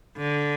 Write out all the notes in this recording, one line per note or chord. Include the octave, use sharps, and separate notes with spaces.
D3